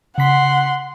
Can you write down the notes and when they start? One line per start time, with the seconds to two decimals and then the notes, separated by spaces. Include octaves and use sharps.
0.18 C#3 F#5 C6 B6